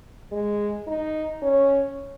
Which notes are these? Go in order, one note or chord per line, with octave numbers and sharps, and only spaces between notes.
G#3
D#4
C#4